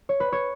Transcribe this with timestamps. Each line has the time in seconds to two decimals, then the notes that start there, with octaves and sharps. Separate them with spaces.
0.09 C#5
0.20 B4
0.32 C#5